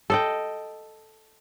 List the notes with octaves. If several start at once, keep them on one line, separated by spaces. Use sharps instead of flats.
A4 D#5 G5